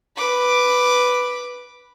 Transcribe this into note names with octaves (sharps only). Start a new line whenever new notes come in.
B4 D6